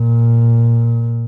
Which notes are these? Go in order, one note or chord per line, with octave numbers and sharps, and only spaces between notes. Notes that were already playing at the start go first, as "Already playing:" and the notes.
Already playing: A#2